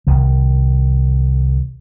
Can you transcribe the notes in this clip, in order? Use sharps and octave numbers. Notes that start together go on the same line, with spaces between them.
C2 D#3